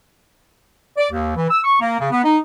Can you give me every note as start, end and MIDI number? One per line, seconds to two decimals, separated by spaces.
0.98 1.07 74
1.12 1.33 39
1.35 1.46 52
1.50 1.62 88
1.64 1.78 85
1.81 1.96 58
1.99 2.07 49
2.11 2.22 59
2.24 2.38 63